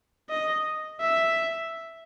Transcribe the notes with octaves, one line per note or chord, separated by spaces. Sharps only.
D#5
E5